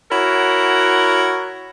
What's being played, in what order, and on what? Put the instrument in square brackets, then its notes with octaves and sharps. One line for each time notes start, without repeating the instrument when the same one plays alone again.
[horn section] E4 F#4 A#4 C#5 F#5